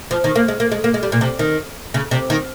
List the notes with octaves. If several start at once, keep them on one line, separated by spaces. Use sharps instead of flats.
F3
D#3
A#3
G#3
A#3
G#3
A#3
G#3
G3
A#2
C3
D#3
C#3
C3
D#3